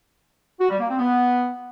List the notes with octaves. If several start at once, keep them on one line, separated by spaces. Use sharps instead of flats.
F#4
G3
A#3
C4
B3